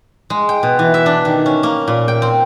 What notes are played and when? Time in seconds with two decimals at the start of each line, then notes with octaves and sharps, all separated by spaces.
0.30 G#3
0.49 G5
0.63 B2
0.79 E3
0.94 E5
1.06 D4
1.25 D#3
1.46 C#4
1.63 A#3
1.88 A#2
2.08 G5
2.22 C4